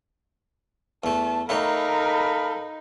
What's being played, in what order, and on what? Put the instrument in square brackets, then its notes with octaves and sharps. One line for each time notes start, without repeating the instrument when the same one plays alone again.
[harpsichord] E2 A3 [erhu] A5
[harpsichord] A3 G4 C#5 [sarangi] D#4 [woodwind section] A4 F5 B5 [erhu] A#4